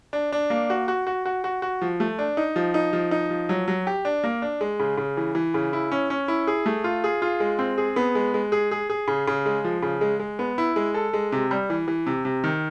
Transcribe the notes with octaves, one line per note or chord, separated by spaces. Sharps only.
D4
D4
A#3
F#4
F#4
F#4
F#4
F#4
F#4
F3
A3
D4
D#4
F3
D#4
F3
D#4
F3
F#3
F#3
G4
D4
A#3
D4
G#3
C#3
C#3
E3
E3
C#3
E4
C#4
C#4
E4
G#4
A3
F4
G#4
F4
G#3
C4
G#4
B3
G#3
G#3
G#4
G#4
G#4
C#3
C#3
G#3
F3
C#3
G#3
G#3
B3
E4
G#3
A4
G#3
C3
G3
E3
E3
C3
C3
D#3